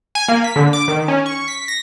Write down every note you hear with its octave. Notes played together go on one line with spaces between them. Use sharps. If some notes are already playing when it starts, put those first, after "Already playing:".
G#5
A#3
B6
D3
D6
D#3
C#4
C#6
B6
A#6